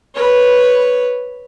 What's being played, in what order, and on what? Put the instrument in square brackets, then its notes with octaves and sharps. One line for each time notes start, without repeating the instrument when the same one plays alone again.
[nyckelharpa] B4 C#5